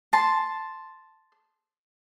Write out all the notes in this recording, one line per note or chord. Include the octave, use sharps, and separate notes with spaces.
A5 C6